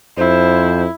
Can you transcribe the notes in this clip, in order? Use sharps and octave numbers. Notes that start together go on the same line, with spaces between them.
F2 E4 C5